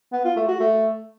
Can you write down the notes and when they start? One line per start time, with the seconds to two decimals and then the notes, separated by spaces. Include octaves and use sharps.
0.13 B3
0.24 F4
0.36 A3
0.48 F#4
0.60 A3